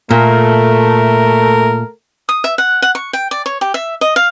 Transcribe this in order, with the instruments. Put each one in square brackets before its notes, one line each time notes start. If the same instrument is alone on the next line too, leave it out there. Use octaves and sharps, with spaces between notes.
[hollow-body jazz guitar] A#2 [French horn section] A3 [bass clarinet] A#4
[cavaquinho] D#6
E5
F#5
F#5
C#6
G5
D5
C#5
G4
E5
D#5
F5